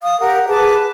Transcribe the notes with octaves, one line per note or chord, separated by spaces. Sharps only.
F5 D#6
G4 A#4 F#5
G#4 B4 A5 D6